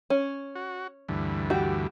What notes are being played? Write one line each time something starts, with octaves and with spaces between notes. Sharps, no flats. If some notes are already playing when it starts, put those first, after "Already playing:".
C#4
F#4
D2 G2 E3
F#4 G4